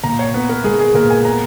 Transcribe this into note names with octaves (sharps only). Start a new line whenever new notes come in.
A#2 A#5
C#5
B3 B4
A#4
G#3 G#4
G#4
A#2 A#4
G#5
B3 A#5